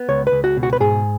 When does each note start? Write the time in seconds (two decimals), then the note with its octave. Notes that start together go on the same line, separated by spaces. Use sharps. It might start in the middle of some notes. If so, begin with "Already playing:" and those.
Already playing: B3
0.08 C#2 C#5
0.27 B4
0.32 C#2
0.44 F#4
0.57 B2
0.63 F#4
0.73 B4
0.80 G#2 G#4